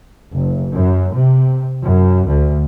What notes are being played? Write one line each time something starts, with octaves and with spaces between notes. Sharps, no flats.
F#1
F#2
C3
F#2
D2